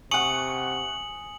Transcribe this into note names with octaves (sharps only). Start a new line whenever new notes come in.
C3 F#5 G#5 C#6 D#6 C#7 F#7